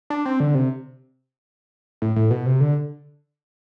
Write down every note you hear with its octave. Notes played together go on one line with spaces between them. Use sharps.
D4
C4
D3
C3
A2
A2
B2
C3
D3